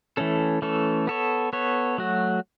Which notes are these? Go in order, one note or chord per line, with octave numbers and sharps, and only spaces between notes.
E3 A3 C#4 A4
E3 A3 C#4 A4
B3 A4 C#5
B3 A4 C#5
F#3 A3 F#4